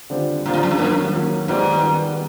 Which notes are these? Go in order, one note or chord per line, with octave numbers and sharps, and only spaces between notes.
D3 G3 C4 F4
A#2 D3 G3 C4 F4
A2
F#2
G2
D#3 F#3 A#3
D#3 F#3 A#3
G#2 D#3 G3 B3
D#3 G3 B3